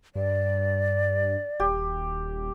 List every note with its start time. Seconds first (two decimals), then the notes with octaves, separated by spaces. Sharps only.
0.15 G2 D5
1.60 D#1 G4